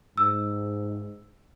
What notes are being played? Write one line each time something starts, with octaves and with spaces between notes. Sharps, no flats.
G#2 E6